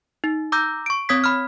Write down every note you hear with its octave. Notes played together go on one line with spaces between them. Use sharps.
D#4
A#5 D6 E6 G6 A#6
C#6 D7
C4 C#5 D#6 G#6 B6
B5 F6